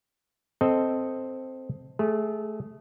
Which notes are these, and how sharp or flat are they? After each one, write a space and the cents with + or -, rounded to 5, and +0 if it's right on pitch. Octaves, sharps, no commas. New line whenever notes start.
C4 +0 A4 +0 D#5 +0
A3 -20 G#4 +0